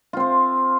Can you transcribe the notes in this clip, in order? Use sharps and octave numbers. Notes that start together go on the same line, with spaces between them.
C4 F4 C5